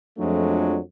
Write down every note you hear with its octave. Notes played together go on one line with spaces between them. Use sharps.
F2 F3 F#3 G#3 A3 D4